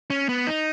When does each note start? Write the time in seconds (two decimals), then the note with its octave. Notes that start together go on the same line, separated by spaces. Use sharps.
0.10 C#4
0.29 B3
0.47 D#4